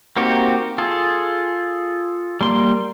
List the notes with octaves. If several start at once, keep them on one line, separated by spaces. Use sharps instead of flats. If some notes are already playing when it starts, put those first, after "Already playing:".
A#3 C4 D#4 F#4 G4
F4 G#4 A4
G3 A#3 C6